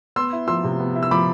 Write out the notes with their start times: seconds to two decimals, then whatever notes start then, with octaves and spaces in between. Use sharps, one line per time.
0.16 B3 C6 E6
0.33 E4
0.48 F3 C6 E6
0.64 C3
0.80 B3
0.95 E4
1.03 E6
1.11 F3 B5 D6